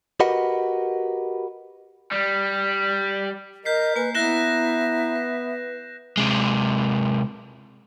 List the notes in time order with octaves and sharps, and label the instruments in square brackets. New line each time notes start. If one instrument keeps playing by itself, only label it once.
[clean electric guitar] F#4 G4 A#4 B4 D#5 F#5
[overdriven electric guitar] G3
[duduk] A#4 [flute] D#5 [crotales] G6 B6 C7
[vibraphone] A#3 G#5 [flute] B4
[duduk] B3 [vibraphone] E4 A#5 [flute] E5 [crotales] F#6 A#6 E7
[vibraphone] B4
[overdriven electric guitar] C3 G#3